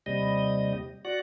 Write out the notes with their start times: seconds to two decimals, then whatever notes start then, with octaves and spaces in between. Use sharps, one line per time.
0.06 D#2 C3 G3 D#5
1.05 F#4 D5 F#5